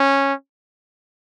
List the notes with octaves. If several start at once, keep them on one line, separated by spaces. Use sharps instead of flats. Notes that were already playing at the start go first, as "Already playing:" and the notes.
Already playing: C#4